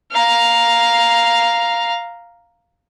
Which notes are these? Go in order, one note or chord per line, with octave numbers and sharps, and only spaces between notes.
F5 A#5